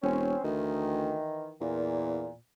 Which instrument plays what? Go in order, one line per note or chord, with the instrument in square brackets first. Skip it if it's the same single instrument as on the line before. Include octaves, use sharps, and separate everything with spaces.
[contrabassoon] E1 [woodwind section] C4 C#4
[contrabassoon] D2 [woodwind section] D#3 E3
[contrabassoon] E2 [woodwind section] A#2